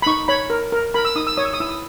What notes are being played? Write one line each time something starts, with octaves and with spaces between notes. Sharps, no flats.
B5
D#4 C#6
C#5 B5
A#4
A#4
A#4 B5
E6
D#4 D#6
E6
C#5 D#6
E6
D#6
E4 E6
D#6